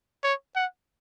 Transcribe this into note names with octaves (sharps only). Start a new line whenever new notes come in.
C#5
F#5